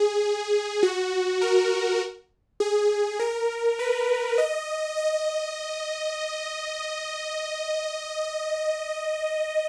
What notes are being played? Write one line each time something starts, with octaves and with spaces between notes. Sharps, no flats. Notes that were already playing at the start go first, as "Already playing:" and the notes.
Already playing: G#4
F#4
A#4
G#4
A#4
B4
D#5
D#5